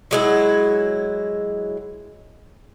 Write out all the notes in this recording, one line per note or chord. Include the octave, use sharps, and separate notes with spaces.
F#3 G#3 E4